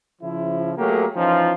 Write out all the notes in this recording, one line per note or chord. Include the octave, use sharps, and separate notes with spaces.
C#3 F3 E4
F#3 A3 A#3 G4 G#4 A#4
E3 F3 C#4 D#4 F4